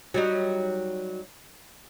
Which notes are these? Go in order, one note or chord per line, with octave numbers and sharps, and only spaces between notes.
F#3 G3 D#4